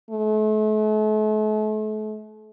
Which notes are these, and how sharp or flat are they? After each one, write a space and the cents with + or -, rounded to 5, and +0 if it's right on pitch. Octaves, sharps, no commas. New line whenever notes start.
A3 -40